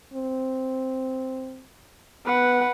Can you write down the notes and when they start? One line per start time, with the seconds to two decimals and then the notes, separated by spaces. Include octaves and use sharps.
0.14 C4
2.26 B3 B4 F#5